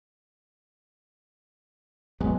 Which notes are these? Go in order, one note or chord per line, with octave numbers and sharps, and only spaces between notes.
B1 F#3 G#3 B3